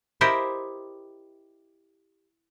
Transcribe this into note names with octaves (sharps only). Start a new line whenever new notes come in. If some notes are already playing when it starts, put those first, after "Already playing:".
E4 G4 A#4 C5 D#5